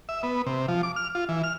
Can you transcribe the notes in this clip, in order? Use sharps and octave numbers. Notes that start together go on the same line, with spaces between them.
E5
B3
C3
F3
D6
F6
F4
E3
F6